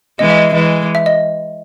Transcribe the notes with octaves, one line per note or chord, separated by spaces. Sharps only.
E3 G#3 D#5
E5
D#5
E3 G#3
E5
D#5